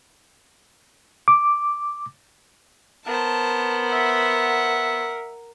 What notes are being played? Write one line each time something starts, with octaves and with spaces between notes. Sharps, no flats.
D6
B3 A#4 C5 A5
E5 F#5